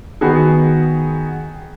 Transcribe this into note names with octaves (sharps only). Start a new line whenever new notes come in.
D#3 B3 F#4 G#4